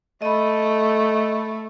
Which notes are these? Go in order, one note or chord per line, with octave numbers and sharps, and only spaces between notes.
A3 D#5 B5